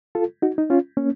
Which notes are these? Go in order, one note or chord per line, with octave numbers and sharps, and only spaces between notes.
F4 A4
D#4 F#4
D#4
C#4 F4
A#3 C#4